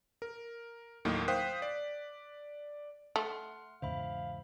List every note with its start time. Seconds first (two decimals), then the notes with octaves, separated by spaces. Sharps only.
0.22 A#4
1.05 D#2 A2 D#3 F#3 A#3
1.28 C5 F5 G5 D#6 F#6 B6
1.62 D5
3.16 A3 F#5 C6 F6
3.82 E2 G#2 C#3 C5 E5 F5 B5